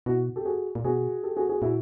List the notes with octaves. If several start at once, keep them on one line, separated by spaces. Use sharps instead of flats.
B2 E4 F#4
G4 A4
F#4 G#4
A#2
B2 F#4 G#4
G4 A4
F#4 G#4
F#4 G#4
A#2 E4 F#4